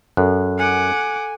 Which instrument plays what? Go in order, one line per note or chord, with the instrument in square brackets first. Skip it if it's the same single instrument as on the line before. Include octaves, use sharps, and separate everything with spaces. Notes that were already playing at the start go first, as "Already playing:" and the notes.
[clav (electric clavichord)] F#2 [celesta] A4 F#6
[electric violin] F#5 D6 [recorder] G#5